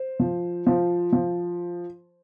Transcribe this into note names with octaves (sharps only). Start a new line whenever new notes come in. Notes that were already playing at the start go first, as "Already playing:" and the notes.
Already playing: C5
F3
F3
F3